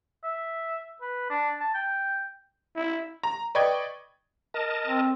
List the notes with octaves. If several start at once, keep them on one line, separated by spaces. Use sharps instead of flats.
E5
B4
D4
A5
G5
E4
A#5
B4 D5 D#5 G5 C#6 G#6
A#4 D#5 A5
C4